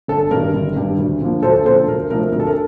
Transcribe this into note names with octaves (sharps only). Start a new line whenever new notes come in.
G1 A4
G2 D#3 G3 A#4
G1
G2 D#3 G3
D2
D3 F3 A#3
D2 A4 C5
D3 F3 A#3 A4 C5
D2 A#4
C3 F3 A3 D#4 A#4
D2 A#4
A4
A#4